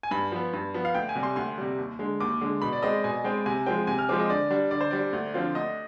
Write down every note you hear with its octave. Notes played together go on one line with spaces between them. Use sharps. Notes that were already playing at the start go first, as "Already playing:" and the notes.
G#5
G2 B5
F3 B3
G2
F3 B3
F5
D2 G5
G#5
C3 G3
C6
D2 C6
C3 G3
D#2
D3 G#3
D#2 D6
D3 G#3
B2 B5
D5
G#3 C4 D#5
B2 G#5
G#3 C4 G5
C3 G#5
F3 G#3 C4 G5
C3 G#5
F6
F3 G#3 C4 D6
D#5
D3 D5
G3 D4
D3 D5
C5
G3 D4 D5
D2
D3 F3 C4 F4
D2 D#5